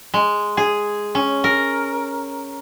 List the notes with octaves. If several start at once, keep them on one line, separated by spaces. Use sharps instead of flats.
G#3
G#4
C#4
A#4